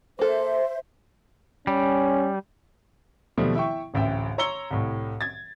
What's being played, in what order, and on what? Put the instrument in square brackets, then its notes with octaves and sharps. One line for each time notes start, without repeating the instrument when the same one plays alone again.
[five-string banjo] A#3 A4 [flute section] C5 E5
[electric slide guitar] G3 [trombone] C#4
[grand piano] D#2 B2 F3 G3 A3
E4 E5 G5 C#6
D1 A1 E5 G5
C#5 A#5 C6 E6 C#7 G7
C2 A2
G#6 A6